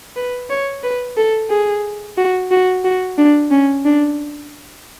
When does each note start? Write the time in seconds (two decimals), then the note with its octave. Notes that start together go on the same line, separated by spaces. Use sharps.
0.16 B4
0.50 C#5
0.83 B4
1.17 A4
1.50 G#4
2.18 F#4
2.51 F#4
2.85 F#4
3.18 D4
3.51 C#4
3.85 D4